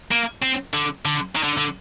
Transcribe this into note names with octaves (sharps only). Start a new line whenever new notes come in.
A#3
C4
D3
D3
D#3
D3
D3